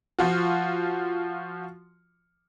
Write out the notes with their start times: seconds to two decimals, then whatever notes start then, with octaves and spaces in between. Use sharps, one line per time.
0.19 F3 F4 F#4